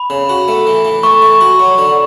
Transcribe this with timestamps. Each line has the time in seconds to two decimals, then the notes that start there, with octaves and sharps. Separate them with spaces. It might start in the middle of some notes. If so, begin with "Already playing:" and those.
Already playing: B5
0.10 C#3
0.29 F#4
0.48 A3
0.67 E3
0.85 E3
1.03 A3 C#6
1.22 E3
1.41 F#4
1.60 F#3
1.78 D3